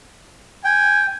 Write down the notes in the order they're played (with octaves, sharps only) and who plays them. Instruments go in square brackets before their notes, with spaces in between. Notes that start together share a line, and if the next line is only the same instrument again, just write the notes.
[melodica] G5 [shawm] G#5